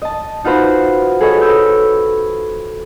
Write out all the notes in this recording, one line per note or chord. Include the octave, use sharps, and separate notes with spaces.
D#5 A5
D#4 F4 F#4 B4 C5 B5
G#4 A4 B4 C#5 D#5 G#5
B5 D#6 E6 G6